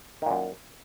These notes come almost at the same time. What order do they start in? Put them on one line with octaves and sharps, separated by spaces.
D#3 A#2 F#2